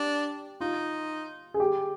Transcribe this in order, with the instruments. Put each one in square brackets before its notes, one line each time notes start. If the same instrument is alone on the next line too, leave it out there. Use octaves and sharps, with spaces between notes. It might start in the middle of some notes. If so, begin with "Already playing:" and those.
Already playing: [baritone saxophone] D4 [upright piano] G4
[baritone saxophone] D#4 [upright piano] F4
[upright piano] G#4
G4